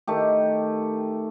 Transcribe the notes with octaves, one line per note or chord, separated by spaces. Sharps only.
D#3 A3 G4